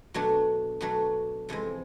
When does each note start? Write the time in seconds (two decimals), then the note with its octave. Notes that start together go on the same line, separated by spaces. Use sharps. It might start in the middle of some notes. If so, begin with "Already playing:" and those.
0.14 B2 F#3 A3 D4
0.81 B2 F#3 A3 D4
1.49 F2 C3 E3 G#3